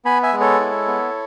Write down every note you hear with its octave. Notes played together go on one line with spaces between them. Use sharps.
B3 G#5 B5
E5 G#5
G#3
A4 C#5
E4
B3